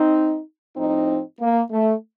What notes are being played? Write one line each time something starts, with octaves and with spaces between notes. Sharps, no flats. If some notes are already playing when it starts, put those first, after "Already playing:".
Already playing: C4 D#4
A2 F3 C4 D#4
A#3
A3